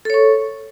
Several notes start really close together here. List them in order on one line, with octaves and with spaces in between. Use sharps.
A4 C#5 C#6